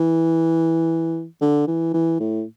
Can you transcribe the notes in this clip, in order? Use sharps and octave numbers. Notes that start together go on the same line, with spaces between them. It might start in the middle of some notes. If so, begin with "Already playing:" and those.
Already playing: E3
D3
E3
E3
A2